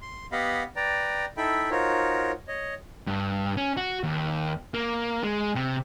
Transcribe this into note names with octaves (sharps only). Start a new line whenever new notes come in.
C6
B3 G4 D#5 F5 F#5 B5
B4 D5 G5 A#5
D#4 E4 A4 E5 G5 B5
D#4 F4 F#4 A#4 C5 C#5
C#5 D#5
G2
C#4
F#4
D#2
A#3
G#3
C3